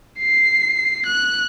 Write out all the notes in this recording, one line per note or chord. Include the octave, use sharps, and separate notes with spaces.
C7
F#6